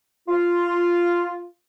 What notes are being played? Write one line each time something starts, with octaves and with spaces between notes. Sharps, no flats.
F4